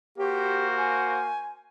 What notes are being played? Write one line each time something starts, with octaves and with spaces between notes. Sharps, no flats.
A#3 F#4 G4 C5
G#5